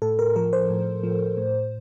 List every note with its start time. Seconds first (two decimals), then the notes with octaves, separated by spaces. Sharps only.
0.02 A2 A4
0.19 A#4
0.36 F3 A#4
0.53 C5
0.70 A2
1.03 F3
1.37 A2